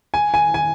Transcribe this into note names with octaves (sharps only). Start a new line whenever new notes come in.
G#5
G#5
G#5